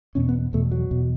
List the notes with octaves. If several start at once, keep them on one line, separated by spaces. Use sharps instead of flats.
E2 B2 C#4
B3
E2 B2 A3
F#3
E2 B2